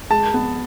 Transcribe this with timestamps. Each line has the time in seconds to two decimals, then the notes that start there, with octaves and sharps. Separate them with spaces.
0.10 G#3 A5
0.34 B3